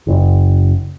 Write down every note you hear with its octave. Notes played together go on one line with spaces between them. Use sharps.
F#1